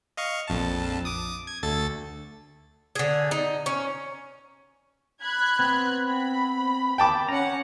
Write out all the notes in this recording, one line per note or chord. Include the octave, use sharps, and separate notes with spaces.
D#5 F5 C#6
A#1 F2 A5
D6 D#6
G#6
D2 A4 A6
D3 G#4
D#4
C#4
B5 F#6 G#6
B3 C4
B5
G5 A5 D6
C#4 F#5 A#5